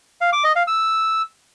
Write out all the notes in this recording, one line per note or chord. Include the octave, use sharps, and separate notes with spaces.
F5
D6
D#5
F5
E6